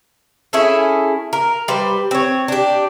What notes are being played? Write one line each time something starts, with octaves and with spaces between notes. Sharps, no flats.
C#4 E4 G#4 A4
A#4
G3 B4 C5
C4 C#5
D4 G4